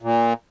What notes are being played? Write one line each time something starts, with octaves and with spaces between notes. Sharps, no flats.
A#2